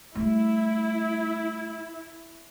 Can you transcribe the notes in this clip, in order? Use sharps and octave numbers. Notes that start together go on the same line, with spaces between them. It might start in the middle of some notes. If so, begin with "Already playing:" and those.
G3 A3 E4